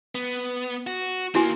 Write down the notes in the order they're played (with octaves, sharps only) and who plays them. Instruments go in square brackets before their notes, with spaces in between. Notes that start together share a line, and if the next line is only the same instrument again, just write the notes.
[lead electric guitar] B3
F#4
[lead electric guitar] D#3 A#3 [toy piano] E4 F#4 G#5